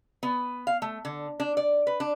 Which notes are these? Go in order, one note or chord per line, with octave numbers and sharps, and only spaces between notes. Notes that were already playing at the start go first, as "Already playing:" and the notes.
B3
F5
A3
D3
D4
D5
B4
D4